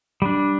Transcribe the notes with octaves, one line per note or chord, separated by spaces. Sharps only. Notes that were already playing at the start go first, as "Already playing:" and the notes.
G3 D4